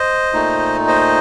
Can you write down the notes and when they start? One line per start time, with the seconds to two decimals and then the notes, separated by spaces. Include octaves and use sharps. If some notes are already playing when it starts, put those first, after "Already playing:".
Already playing: C5 D#5
0.32 A#2 A3 D#4
0.88 C5 D#5